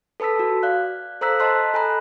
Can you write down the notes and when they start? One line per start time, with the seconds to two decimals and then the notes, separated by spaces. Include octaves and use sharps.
0.20 A4 B4 A5 E6 B6
0.39 F#4
0.63 D5 F5 F#6
1.21 A4 C5 A#5 E6 F#6 B6
1.39 D#5 A5 C6 F#6 B6
1.74 A4 G#5 A#5 B5 F#6